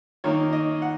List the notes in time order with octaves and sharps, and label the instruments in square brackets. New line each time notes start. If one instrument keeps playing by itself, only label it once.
[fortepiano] D#3 A#3 D#4 C#5
D#5
F#5